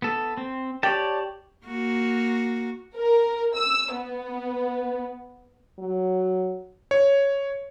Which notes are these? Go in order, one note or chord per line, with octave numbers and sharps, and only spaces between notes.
B3 A4
C4
G4 C#5 D5 A5
A#3 F#4
A#4
E6
B3
F#3
C#5